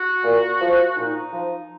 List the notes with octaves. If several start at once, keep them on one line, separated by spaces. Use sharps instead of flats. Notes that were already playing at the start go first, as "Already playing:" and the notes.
Already playing: F#4
A#2
F3
A#2 D#4
F3